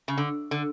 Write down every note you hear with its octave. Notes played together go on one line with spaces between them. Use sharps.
C#3
D3
D3